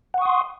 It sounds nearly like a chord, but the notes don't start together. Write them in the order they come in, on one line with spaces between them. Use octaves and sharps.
F#5 C#6 D#6 C6